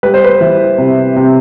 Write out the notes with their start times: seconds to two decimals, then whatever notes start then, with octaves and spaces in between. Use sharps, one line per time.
0.03 G3 B4
0.14 C5
0.24 B4
0.41 E3
0.78 C3
1.17 C3